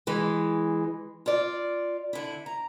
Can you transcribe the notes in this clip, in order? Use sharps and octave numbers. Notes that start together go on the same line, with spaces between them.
E3 G#3
F4 D5
D3 E4
A#5